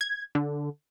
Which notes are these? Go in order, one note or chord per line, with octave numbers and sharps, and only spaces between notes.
G#6
D3